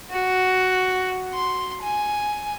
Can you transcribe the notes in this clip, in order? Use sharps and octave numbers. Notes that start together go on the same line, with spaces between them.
F#4
C6
G#5